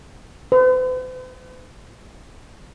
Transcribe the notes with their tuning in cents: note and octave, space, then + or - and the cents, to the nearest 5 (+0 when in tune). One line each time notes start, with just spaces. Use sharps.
C5 -45